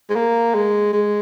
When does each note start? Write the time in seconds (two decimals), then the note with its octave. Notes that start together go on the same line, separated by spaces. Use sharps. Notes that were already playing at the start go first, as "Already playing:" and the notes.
0.10 G#3
0.15 A#3
0.54 G#3
0.93 G#3